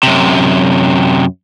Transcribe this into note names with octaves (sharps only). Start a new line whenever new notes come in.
F#2 C3